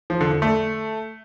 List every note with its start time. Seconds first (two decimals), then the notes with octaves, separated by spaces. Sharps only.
0.10 F3
0.21 D3
0.31 D3
0.42 A3